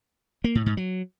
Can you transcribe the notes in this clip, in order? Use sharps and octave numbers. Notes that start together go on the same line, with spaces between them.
A#3
A2
G#2
F#3